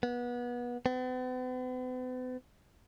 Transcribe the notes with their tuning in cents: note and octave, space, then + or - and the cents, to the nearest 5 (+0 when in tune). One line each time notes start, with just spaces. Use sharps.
B3 -25
B3 +45